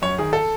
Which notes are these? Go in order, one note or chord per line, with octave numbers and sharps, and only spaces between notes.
F#2 C#5
D#3 G#4
A4